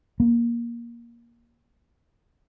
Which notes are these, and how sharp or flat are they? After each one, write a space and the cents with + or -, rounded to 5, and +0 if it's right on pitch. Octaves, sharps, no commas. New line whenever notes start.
A#3 +15